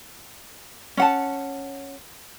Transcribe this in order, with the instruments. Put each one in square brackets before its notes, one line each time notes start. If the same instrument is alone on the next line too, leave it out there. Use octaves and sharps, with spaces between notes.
[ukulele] C#4 F#5 A5